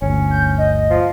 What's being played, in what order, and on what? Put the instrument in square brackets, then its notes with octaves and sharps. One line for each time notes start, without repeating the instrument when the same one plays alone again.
[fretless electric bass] G1 D2 [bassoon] C#4
[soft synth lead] G6
D#5
[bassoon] F3